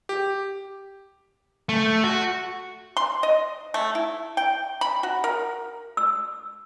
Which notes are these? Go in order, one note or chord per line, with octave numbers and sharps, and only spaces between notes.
G4
A3
F#4
C6
D#5
A3
E4
G5
B5
F#4
A#4
E6